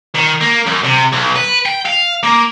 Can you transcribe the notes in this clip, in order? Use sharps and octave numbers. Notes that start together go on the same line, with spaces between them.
D#3
A#3
F#2
C3
B1
B4
G5
F5
A#3